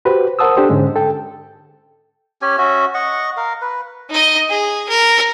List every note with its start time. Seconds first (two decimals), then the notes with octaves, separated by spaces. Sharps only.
0.05 F#4 G4 B4 C5
0.39 A#4 C5 F#5 A5 D#6 E6
0.57 D4 G4 A4 C5
0.69 G#2 D3 G#3 C#4
0.96 A4 G5
2.42 C#4 G4 G#5
2.58 C#4 F#4 E5
2.94 D#5 F#5 C#6
3.37 A#4 F5
3.62 B4
4.10 D#4 D#5
4.49 G#4
4.89 A#4